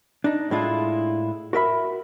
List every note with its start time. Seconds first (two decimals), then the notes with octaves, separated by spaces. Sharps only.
0.24 D4 D#4
0.51 A2 G#3 D4 E4 F4
1.53 F#4 A#4 E5 B5